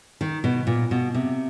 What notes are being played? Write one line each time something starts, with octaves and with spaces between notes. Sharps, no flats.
D#3
B2
A#2
B2
C3